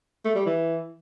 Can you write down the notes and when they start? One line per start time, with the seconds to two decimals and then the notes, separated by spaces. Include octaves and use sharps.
0.25 A3
0.35 G3
0.46 E3